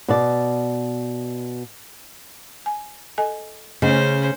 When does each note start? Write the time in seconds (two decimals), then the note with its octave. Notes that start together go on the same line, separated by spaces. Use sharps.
0.08 B2 D5
2.66 G#5
3.18 A4 D#5 G#5
3.82 C#3 A3 C#4 C5 D#5